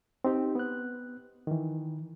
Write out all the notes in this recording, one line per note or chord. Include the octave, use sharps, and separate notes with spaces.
C4 D#4 G4
B3 F#6
D#3 E3